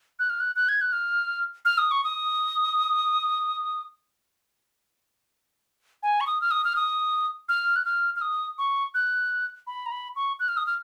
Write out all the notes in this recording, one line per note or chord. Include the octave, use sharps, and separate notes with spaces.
F#6
F6
F#6
F#6
G#6
F#6
F6
F6
D#6
C#6
D#6
G#5
C#6
D#6
F6
D#6
F6
D#6
F6
F#6
F6
F6
D#6
C#6
F#6
B5
A#5
B5
C#6
F#6
F6
D#6
F6